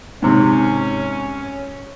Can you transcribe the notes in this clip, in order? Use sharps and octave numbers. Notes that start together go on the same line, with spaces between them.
G#2 C3 D#3 C#4